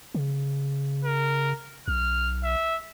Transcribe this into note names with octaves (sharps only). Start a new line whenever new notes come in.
C#3
A#4
B1 F6
E5